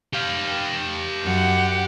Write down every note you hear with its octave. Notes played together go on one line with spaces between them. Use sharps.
G4 F5
F#2 F#5